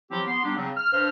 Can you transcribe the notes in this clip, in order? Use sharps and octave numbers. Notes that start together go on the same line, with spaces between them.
F3 F#3 C4 E4 G4
B3 C6
G3 B3 D4 D#4 G4
C#3 F#3 C4
F6
G2 C5 F6